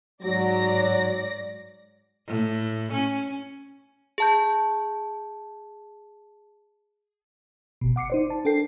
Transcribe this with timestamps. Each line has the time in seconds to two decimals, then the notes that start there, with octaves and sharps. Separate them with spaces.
0.22 G#2 F#3 D5 A#6
2.27 A2
2.93 C#4
4.18 G#4 A5 G6
7.81 G1 B2
7.96 F#5 D6 C7 C#7
8.10 D#4 C5 D5
8.30 A5
8.45 D4 A4 A#4 G5 C7